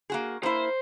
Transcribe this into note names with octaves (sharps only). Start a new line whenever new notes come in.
A#3 F#4 G#4
A#3 E4 C5